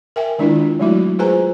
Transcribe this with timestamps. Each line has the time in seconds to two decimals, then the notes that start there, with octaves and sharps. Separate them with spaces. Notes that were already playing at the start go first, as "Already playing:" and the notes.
0.16 A#4 E5 G5 G#5
0.39 D#3 G#3 D4 E4 F4
0.80 F#3 G#3 A3 E4 F#4
1.19 F4 G#4 B4 C5 G#5 A#5